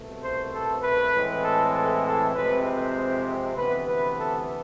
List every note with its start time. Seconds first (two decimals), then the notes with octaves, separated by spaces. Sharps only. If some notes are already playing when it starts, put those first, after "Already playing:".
Already playing: C2 B2 A3
0.22 C5
0.52 A4
0.83 B4
1.13 A2 E3 G#3 C4
1.43 A4
1.74 A4
2.05 A4
2.34 F2 C3 G#3 C4 B4
2.65 C5
3.56 D2 C3 E3 B3 B4
3.87 B4
4.17 A4